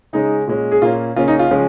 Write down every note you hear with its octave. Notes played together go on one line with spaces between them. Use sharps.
C#3 G#3 C#4 D#4
A#2 G#3 C#4
G#4
A#2 A#3 C#4 F4
C#3 A#3 C#4 F4
D#4
F4
C#3 F3 G#3 C#4